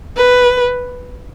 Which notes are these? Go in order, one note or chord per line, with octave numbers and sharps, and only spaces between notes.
B4